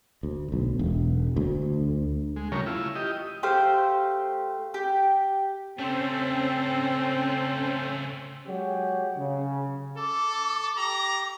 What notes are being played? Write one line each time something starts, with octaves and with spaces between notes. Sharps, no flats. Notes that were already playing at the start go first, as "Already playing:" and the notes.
D2
B1
E1
D2
G#3
C#3 F3 G3 A3 A#4 C#5
E4 F4
G4 D#5
A3 G4 C5 F5
G4
C#3 A3 C4 C#4 A4 C5
F#3 G#3 G4 G#4 C#5 F#5
C#3
A4 D6
G4 A#5